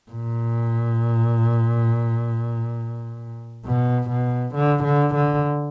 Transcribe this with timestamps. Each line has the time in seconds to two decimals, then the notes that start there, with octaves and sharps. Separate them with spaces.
0.12 A#2
3.65 B2
4.10 B2
4.55 D3
4.84 D3
5.14 D3